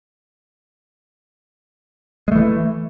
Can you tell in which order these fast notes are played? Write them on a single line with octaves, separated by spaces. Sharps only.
G#3 A3 E3